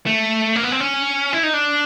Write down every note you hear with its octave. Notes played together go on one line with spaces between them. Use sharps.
A3
A#3
B3
C4
C#4
E4
D#4
D4